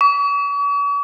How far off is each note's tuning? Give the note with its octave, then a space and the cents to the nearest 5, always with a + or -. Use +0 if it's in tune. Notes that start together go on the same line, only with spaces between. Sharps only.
C#6 +45